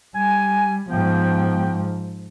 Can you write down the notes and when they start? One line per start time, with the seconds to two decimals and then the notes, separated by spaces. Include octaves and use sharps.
0.15 G3 G#5
0.89 G#2 F3 B3 G5